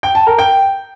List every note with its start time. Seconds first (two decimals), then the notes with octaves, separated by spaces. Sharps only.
0.03 G5
0.15 A5
0.27 A#4
0.38 G5